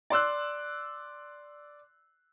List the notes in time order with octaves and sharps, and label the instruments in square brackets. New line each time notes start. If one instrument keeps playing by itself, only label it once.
[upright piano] D5 C6 E6 F#6